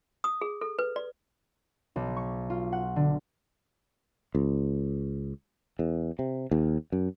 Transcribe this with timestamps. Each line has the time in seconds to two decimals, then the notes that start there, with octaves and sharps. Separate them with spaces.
0.24 D#6
0.41 G#4
0.61 A4
0.79 B4
0.96 D5
1.96 B1
2.17 C#6
2.50 F4
2.72 F#5
2.96 D3
4.35 C#2
5.79 E2
6.19 C3
6.51 D#2
6.92 F#2